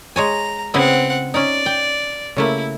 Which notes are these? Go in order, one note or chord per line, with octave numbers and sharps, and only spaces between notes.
G#3 C#5 G#5 A#5
C#3 B3 C4 E4 F#5
C#4 D#4 D5
G5
C#3 A3 A#3 E4